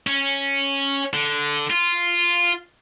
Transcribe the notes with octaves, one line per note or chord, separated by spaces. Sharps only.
C#4
D3
F4